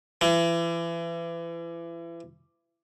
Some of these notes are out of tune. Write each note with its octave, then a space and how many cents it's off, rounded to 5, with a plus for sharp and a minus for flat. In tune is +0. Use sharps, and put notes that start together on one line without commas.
E3 +35